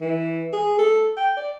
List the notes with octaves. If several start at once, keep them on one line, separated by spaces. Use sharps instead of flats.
E3
G#4
A4
G5
D5